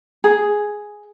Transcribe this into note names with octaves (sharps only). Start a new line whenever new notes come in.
G#4